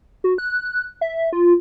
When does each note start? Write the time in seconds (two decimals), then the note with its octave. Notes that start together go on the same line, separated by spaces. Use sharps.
0.24 F#4
0.38 F#6
1.01 E5
1.33 F4